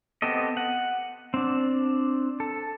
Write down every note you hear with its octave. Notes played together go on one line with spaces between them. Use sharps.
B3 C4 G4 A4 D#5
F#5
C4 D4
A4